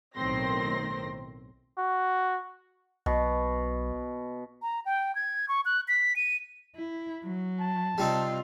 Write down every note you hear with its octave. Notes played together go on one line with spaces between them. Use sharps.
B1 A2 D#3 C4 C6 A#6
F#4
B1 B2
A#5
G5
G#6
C#6
F#6
B6
D#7
E4
F#3
A5
C3 G3 C4 D#4 F4